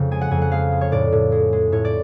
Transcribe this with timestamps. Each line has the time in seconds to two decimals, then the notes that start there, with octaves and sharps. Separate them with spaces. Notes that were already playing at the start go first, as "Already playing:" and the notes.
Already playing: F2 C#3
0.11 G#3 G#5
0.21 F#5
0.31 F2 G#5
0.42 F#5
0.52 G#3 F5
0.72 G#3
0.81 C#5
0.92 A2 D5
1.12 A2
1.32 G#3
1.53 G#3
1.72 A2 C#5
1.85 D5